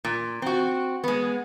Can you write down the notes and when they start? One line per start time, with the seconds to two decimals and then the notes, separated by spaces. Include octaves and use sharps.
0.05 A#2
0.42 C4 F#4
1.04 G#3 B3